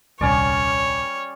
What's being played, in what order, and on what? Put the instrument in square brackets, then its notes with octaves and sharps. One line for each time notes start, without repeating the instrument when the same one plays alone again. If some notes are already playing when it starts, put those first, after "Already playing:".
[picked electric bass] D#1 C2 [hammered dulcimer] G3 C#4 D5 [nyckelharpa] C#5